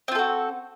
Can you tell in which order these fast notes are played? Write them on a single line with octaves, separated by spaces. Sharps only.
C4 F4 A4 F#4